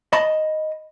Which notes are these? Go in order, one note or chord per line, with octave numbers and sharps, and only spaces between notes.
D#5 A5 B5